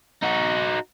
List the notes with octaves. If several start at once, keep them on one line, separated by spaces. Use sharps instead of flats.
D#4 F#4